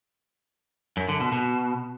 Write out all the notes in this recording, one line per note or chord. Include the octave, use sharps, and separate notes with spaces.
F#2
D3
B2
B2